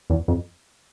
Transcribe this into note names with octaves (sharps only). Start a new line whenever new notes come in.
E2
F2